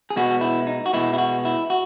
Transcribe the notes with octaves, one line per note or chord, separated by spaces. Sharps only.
G#4
B2 G#3 B3 F#4
E4
D#4
F#4
B2 G#3 B3 E4
E4
F#4
E4
F#4